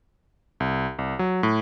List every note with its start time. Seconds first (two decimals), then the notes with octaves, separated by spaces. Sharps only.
0.60 C2
0.99 C2
1.19 F#3
1.43 A2